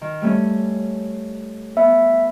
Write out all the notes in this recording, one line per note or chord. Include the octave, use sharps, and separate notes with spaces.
D#3
G3 A3 C#4
B3 E5